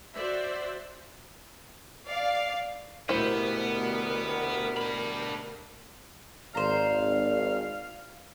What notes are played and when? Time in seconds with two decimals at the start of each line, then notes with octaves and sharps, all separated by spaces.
0.15 F#4 C5 D5 E5
2.06 D5 F5
3.09 D2 B2 B3 E4 G4 A#4 C5
4.77 D4 B5
6.55 G#1 C5 D5 F5 A#5